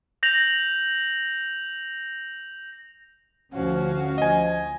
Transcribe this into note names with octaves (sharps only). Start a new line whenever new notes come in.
G6 A#6 F7 F#7
D2 F3 C#4 F#4 F5
F3 D#5 G#5